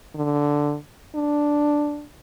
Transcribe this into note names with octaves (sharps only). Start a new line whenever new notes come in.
D3
D4